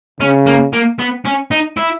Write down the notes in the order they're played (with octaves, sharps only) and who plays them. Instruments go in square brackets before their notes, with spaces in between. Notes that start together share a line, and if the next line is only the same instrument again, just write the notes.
[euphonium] C#3 [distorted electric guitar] C#4
[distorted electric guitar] A#3
A#3
B3
C#4
D#4
E4